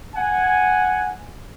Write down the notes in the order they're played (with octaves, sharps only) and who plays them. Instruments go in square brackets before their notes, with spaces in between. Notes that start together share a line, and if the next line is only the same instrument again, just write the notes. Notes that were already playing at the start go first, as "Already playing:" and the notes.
[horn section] F#5 G#5